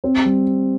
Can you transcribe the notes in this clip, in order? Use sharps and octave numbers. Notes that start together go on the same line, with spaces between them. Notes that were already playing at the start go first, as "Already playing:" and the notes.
C4
G3